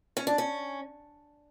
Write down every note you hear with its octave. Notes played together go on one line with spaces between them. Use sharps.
C#4
D4
C#4